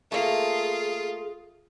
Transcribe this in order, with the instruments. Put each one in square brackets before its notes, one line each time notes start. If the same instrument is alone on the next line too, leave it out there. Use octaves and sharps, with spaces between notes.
[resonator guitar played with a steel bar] A3 A#3 [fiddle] F4 [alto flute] G#4